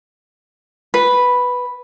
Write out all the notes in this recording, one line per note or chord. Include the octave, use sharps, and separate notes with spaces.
B4